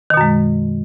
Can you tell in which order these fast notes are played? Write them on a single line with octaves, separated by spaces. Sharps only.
D#3 B2 F#2 G#3